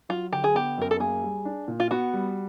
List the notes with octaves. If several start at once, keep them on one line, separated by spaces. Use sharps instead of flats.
F#3 F4
D3 G4
G#4
B3 G4
F#2 A#4
A4
A#3 G#4
G3
D4
A#2
F4
B3 F#4
G3